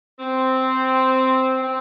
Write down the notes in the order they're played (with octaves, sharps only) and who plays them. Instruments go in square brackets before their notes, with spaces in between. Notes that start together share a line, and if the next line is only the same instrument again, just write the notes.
[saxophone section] C4
C4